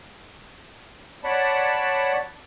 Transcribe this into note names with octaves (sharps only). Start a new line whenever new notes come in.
C#5 D5 F#5 A5 B5